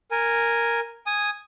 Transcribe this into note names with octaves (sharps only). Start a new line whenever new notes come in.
A#4 G#5
G#5 D#6